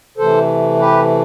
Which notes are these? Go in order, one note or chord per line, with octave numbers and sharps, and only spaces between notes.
C3 E3 A3 A4 C5
G4 B4